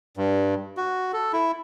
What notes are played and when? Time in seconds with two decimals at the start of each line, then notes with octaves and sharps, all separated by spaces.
0.17 G2
0.77 F#4
1.13 A4
1.33 E4